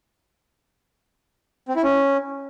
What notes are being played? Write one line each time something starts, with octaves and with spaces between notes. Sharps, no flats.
C4
E4
C#4